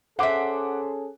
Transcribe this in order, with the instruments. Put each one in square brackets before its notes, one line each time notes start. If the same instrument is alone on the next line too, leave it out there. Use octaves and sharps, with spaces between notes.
[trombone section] C#4 G#4 A4 [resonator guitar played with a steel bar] C5 E5 [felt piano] F#5 D6